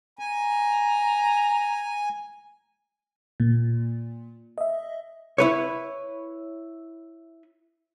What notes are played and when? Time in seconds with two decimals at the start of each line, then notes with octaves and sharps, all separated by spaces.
0.19 G#5 A#5
3.40 A#2
4.58 D#5 E5
5.38 E4 B4 C#5